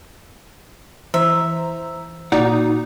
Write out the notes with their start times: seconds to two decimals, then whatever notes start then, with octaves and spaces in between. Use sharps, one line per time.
1.14 E3 C5 E5 A#5
2.32 A#2 D#4 F#4 D5 F#5 D#6